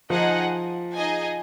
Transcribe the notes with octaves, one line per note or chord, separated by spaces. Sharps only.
F3 D#4 G#4 D#5 F#5
D#4 G#4 D#5 G#5